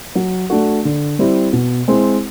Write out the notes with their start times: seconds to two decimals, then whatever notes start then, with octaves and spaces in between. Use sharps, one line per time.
0.15 F#3
0.50 A3 D4 F#4
0.85 D3
1.19 G3 C4 E4
1.53 B2
1.88 G#3 C4 E4